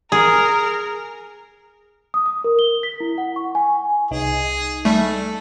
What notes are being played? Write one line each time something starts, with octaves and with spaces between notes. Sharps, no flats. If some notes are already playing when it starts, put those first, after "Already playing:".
G#4 A#4
D#6
D#6
A#4
G7
B6
E4
F#5
C#6
G#5
C2 D#4 G#4
G3 A3 A4